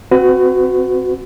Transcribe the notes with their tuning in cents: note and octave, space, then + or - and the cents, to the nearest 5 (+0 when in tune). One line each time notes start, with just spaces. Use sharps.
C4 +0 F#4 -5 B4 +40